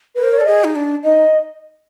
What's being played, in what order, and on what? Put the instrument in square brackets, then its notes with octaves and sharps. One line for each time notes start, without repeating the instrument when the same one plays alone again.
[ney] A#4 [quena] B4
[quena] C5
C#5
[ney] A4 [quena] D5
[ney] G#4 [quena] D#5
[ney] D#4
D4
[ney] D#4 [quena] D#5